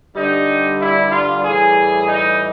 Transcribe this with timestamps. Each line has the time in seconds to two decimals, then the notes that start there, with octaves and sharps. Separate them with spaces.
0.14 G2 D3 G3 D#4
0.79 E4
1.11 F4
1.44 A2 E3 G3 G#4
2.08 D#4